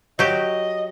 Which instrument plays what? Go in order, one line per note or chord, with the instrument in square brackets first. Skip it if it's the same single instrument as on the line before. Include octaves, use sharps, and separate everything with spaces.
[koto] F#3 G4 [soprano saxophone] D#5